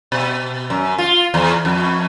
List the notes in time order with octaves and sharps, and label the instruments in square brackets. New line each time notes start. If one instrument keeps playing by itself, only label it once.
[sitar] B2
F#2
F4
E2
F2